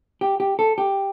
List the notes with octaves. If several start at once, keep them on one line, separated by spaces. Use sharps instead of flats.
G4
G4
A4
G4